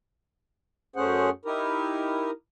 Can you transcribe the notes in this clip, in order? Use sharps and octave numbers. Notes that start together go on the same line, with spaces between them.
F#2 A3 C#4 G#4 C5 F#5
D#4 E4 G4 A#4